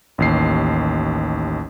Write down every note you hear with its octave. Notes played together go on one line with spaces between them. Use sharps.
A1 D#2 C7